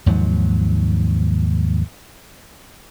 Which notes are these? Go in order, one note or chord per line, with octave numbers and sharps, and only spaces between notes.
D#2 G#2 F3 F#3